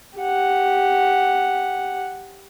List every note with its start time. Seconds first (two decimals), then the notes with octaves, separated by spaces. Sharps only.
0.18 G4 F#5